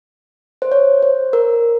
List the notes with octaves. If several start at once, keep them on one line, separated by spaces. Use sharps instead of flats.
C5
C#5
C5
A#4